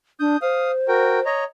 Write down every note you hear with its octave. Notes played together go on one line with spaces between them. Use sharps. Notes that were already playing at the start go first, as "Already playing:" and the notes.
D4 D#6 G6
C5 F5 D#6
F#4 A#4 G5
C#5 D#5 A#5